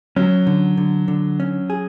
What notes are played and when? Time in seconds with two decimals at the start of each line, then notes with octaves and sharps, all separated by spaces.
0.16 F#3 C#4
0.47 D3
0.78 D3
1.08 D3
1.40 C#4
1.70 G#4